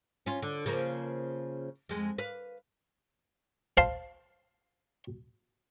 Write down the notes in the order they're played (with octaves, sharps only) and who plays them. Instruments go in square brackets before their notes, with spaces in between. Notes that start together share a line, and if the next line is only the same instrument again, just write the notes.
[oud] C#4 F4
D3
C#3 F3 A#3
F2 G#3
B4 F5
[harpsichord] C5 F5 A5 C6